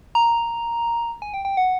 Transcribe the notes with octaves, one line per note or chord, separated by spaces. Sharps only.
A#5
G#5
G5
G5
F#5